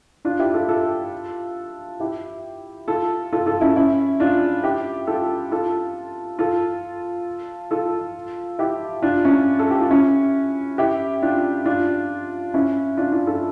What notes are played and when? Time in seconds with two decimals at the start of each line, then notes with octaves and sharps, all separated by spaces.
0.25 D4 F4
0.39 E4 G4
0.54 F4 A4
0.69 F4 A4
2.00 E4 G4
2.88 F4 A4
3.33 F4 A4
3.46 F4 A4
3.61 C#4 E4
3.76 C#4 E4
4.20 D4 F4
4.63 E4 G4
5.07 F4 A4
5.52 F4 A4
6.39 F4 A4
7.71 F4 A4
8.59 E4 G4
9.02 D4 F4
9.25 C#4 E4
9.59 A4
9.70 G4
9.80 F4
9.90 C#4 E4
10.78 E4 G4
11.22 D4 F4
11.66 D4 F4
12.54 C#4 E4
12.97 D4 F4
13.12 D4 F4
13.27 F4 A4